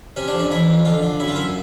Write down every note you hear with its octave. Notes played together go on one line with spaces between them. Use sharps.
C3 C#4
D4
F2
C#4
E3 E4
F2
D3 F4
D3
F#2 E4
F4
F#2 E4